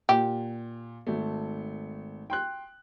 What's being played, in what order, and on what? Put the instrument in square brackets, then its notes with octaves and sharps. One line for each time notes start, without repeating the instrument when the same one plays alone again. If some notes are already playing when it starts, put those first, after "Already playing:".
[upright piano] A#2 [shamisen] G4
[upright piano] G#1 A3
G5 C6 F#6